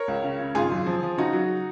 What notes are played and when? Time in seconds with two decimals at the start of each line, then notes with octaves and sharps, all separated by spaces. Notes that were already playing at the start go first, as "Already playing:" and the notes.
Already playing: A#4 C#5
0.08 C#2
0.24 C#3
0.40 C#3
0.55 G#1 F4 G#4
0.72 F#2
0.87 F3
1.03 F3
1.17 C#3 D#4 F#4
1.33 F#3